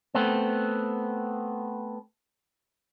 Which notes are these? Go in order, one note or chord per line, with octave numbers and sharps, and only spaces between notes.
A3 B3 C4